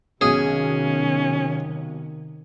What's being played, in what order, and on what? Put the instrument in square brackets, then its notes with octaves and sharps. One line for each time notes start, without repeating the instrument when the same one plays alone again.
[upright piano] B1 [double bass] C3 D#3 [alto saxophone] C#4 [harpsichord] G#4